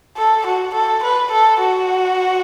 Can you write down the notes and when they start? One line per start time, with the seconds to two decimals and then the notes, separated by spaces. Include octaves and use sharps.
0.18 A4
0.47 F#4
0.74 A4
1.04 B4
1.32 A4
1.60 F#4